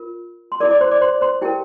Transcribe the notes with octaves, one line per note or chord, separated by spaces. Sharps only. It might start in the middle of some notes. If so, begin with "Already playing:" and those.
Already playing: F4 A#4
C6
E4 A#4 D5 D6
D5 D6
C5 C6
D5 D6
C5 C6
C5 C6
E4 G4 A#4 G5